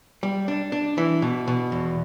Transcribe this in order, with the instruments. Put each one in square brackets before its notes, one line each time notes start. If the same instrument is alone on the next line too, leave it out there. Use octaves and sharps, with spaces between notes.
[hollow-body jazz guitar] G3
D4
D4
E3
B2
B2
E2